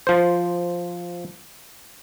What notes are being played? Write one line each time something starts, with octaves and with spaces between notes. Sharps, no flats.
F3 C5